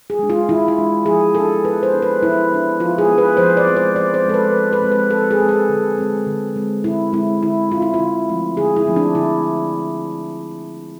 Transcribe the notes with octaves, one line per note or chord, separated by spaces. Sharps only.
G#4
G#3 D4
F4
E3 E4
E4
G#3 D4
F3 G#4
B3 D4 A4
F3 B4
C5
B3 D4
B4
F3 E4
B3 D4
F3 F4
G#4
B3
D4 B4
F3 C5
D5
G#3 C4
C5
F3 D5
C5
G#3 C4 A4
B4
F3
B4
G#3 C4
B4
F3 A4
G#4
G#3 C4
A4
D3
G#3 C4
D3
G#3 C4
D3 E4
G#3 C4 E4
D3 E4
G#3 C4 F4
E4
F4
D3
F3 A3 C4
D3 G#4
E4
F3 A3 C4
D4
D3 E4